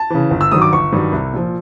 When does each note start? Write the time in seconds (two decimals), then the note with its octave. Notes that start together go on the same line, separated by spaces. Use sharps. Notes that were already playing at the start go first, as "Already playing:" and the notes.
Already playing: A5
0.10 C#3 E3
0.31 G1
0.41 E6
0.52 G2 D#3 F#3 D#6
0.62 D6
0.73 G1 C#6
0.92 G2 D#3 F#3
1.12 C2
1.33 A#2 F3